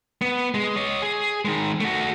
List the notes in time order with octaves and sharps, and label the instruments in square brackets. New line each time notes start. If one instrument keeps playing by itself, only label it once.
[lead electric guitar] B3
G#3
C#5 D#5
G#4
D#3 G#3
A3 F#4